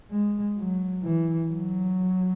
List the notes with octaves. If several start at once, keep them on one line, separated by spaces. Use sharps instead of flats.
G#3
F#3
E3
F#3